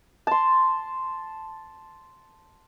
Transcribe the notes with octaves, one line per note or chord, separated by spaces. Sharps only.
A5 C6